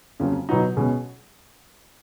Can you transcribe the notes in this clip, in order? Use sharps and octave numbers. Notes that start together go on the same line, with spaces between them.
F2 C#3 F#3 A#3
B2 F#3 B3 D#4 F#4
B2 G#3 C#4 G#4